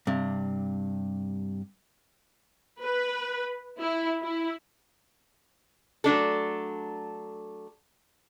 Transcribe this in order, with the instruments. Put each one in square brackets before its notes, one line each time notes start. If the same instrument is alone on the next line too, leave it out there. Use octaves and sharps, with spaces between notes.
[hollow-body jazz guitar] G2 C3
[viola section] B4
E4
E4
[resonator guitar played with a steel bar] F#3 A3 D4 A4